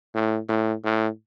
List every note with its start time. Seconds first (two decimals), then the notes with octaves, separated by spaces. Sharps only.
0.15 A2
0.49 A2
0.84 A2